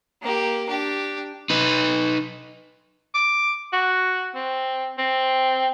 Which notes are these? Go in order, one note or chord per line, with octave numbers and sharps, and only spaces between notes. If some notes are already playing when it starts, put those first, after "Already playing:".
A#3 G4
D4 G4
D#4 B4
D6
F#4
C4
C4